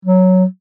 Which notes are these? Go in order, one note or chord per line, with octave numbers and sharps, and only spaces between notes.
F#3